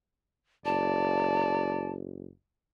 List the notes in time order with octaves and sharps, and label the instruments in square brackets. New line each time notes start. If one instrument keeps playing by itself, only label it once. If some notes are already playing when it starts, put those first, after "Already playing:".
[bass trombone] F#1 [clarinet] D5 [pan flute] A5